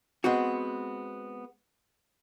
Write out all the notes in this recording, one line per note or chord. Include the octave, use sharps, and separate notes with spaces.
G#3 B3 C4 F#4